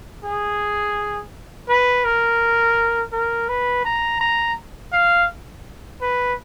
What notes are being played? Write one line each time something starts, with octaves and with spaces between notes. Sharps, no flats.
G#4
B4
A#4
A#4
B4
A#5
A#5
F5
B4